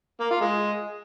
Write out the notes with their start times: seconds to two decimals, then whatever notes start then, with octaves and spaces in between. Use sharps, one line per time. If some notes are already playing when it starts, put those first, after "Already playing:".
0.20 A#3
0.31 F4
0.41 G#3